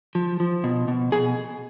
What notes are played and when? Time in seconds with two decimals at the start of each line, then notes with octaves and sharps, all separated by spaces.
0.15 F3
0.40 F3
0.64 B2
0.88 B2
1.12 B2 G#4